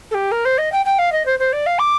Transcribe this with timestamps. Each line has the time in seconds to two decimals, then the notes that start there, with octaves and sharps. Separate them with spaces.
0.11 A4
0.14 G4
0.32 A#4
0.45 C5
0.58 D#5
0.72 G5
0.85 G5
0.99 F5
1.12 D#5
1.26 C5
1.39 C5
1.53 D5
1.66 F5
1.79 D6